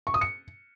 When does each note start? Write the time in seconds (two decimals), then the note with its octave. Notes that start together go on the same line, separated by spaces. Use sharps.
0.07 C#6
0.14 D#6
0.21 C#7